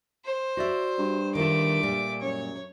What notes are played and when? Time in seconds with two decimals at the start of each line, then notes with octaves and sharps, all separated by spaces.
0.25 C5
0.57 F#4 D5 E5
0.98 G2
1.35 D#3 A3 F4 D6
1.83 A#2 G3
2.22 F#2 C#5